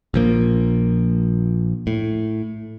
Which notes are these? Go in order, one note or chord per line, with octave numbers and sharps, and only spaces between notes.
A#1 F3 A#3
A2